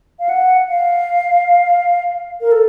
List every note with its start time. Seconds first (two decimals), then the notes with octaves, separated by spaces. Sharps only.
0.19 F5
0.29 F#5
0.68 F5
2.41 A#4
2.52 A4